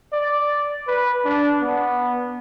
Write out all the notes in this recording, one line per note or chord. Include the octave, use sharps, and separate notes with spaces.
D5
B4
D4
B3